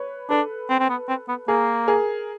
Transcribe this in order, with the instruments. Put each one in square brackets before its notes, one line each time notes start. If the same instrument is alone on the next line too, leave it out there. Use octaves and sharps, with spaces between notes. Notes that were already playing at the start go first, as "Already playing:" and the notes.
Already playing: [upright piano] B4 C#5
[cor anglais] D4 [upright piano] A4 B4
[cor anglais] C4
C4
B3
C4
B3
[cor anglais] A#3 [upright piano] G#4 A#4
[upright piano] G#4 A#4